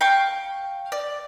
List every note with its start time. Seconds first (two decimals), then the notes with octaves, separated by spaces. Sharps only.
0.01 F5 G5 C#6
0.92 D5